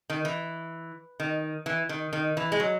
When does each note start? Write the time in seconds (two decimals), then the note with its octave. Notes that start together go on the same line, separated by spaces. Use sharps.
0.10 D#3
0.25 E3
1.20 D#3
1.66 E3
1.89 D#3
2.13 D#3
2.37 E3
2.52 G#3
2.60 F#3